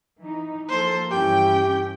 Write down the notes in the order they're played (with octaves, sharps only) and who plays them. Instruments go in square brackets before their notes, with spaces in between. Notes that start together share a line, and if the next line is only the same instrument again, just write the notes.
[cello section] E3 D#4
[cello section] F3 A#3 A4 [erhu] C5
[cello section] G2 E3 C#4 [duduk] G4 [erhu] G5